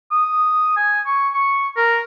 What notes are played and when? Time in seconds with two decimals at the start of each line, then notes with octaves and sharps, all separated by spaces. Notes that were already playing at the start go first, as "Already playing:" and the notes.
0.11 D#6
0.77 G#5
1.07 C#6
1.34 C#6
1.77 A#4